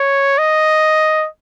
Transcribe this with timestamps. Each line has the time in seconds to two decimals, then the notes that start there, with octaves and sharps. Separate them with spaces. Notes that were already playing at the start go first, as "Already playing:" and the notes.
Already playing: C#5
0.38 D#5